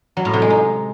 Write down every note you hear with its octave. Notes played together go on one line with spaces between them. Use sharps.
F#3
A2
C3
G#3
D#4